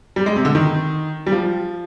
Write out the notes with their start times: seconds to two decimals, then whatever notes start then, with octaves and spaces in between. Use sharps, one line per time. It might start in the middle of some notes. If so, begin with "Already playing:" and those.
0.16 G3
0.26 G#3
0.36 C3
0.45 D3
0.55 D#3
1.27 G3
1.32 F3